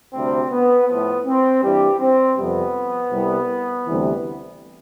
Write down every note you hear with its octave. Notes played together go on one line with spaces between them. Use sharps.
D2 C3 G3 C4
B3
A2 F3 B3
C4
G2 E3 G3 G4
C4
F2 C3 G3 B3
C2 C3 G3
D2 C3 E3 G3